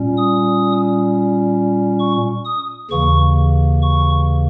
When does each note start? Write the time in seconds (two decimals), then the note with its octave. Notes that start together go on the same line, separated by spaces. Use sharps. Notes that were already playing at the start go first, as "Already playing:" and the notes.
Already playing: A#2 G3 C#4
0.17 D#6
1.99 C#6
2.45 D#6
2.91 D#2 C#3 E3 A#3 C#6
3.82 C#6